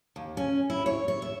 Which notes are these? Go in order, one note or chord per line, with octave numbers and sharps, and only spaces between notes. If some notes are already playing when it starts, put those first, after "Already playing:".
D#2
C#4
E4
C#5
C#5
E5